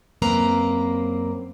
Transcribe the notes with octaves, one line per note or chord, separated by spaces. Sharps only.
F#2 A#3 C4 B4 A#5